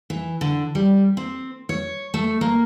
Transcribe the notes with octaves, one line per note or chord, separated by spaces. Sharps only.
E3
D3
G3
C4
C#5
A3
A#3